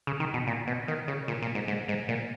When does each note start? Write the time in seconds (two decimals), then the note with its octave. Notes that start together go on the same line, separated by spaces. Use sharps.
0.07 C#3
0.20 D#3
0.34 B2
0.47 A#2
0.67 B2
0.88 D#3
1.08 C#3
1.28 A#2
1.42 A#2
1.55 G#2
1.68 G#2
1.88 G#2
2.08 A#2